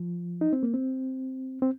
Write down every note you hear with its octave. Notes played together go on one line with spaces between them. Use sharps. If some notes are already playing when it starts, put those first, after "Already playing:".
Already playing: F3
D#4
C4
A#3
C4
C4